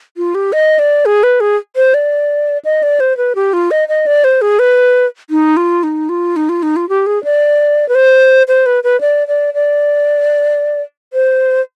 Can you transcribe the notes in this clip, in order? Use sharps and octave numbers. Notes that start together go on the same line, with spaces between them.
F4
G4
D#5
D5
G#4
B4
G#4
C5
D5
D#5
D5
C5
B4
G4
F4
D#5
D#5
D5
C5
G#4
B4
D#4
F4
D#4
F4
D#4
F4
D#4
F4
G4
G#4
D5
B4
C5
C5
B4
B4
D5
D5
D5
C5